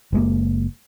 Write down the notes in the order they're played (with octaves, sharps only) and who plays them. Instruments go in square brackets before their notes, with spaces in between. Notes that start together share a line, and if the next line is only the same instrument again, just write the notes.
[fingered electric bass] F#1 G#3 A#3